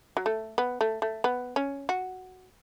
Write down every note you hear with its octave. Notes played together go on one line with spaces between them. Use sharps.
F#3
A3
B3
A3
A3
B3
C#4
F#4